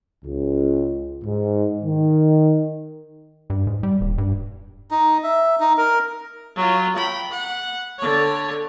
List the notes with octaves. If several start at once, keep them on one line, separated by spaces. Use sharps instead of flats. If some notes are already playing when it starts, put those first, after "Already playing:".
C#2
G#2
D#3
G2
G#2
G3
D#1
G2
D#4
E5
D#4
A#4
F#3 F4
G5 B5
F#5
D3 C#5